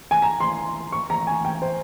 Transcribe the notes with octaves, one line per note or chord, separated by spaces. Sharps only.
G#5
A#5
C6
C#6
A#5
G#5
G5
C5